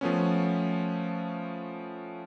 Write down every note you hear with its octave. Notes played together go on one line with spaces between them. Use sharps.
F3 A3 B3 C#4